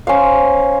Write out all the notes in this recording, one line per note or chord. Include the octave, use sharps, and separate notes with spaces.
C#4 C5 F5